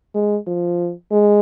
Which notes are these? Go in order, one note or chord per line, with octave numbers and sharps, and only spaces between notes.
G#3
F3
G#3